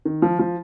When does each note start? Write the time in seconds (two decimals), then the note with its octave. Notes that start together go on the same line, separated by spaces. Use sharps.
0.05 D#3
0.22 F3
0.39 F3